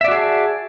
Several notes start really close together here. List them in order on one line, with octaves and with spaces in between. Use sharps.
E5 D5 F#4 G#4 A5